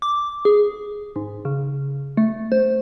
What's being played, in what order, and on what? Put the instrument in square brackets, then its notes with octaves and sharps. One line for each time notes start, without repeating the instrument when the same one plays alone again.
[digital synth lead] D6
G#4
G#2
C#3
A3
C5